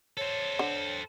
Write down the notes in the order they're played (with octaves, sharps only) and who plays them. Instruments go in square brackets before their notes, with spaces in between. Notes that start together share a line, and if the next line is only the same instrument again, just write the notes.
[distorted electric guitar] A4 C5 [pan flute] C#5
[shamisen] D3